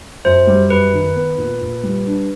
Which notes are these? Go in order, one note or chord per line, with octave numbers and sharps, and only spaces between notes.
F#2 C5
G3
F#2 B4
D#3
B3
A#2
A#2
G3
D4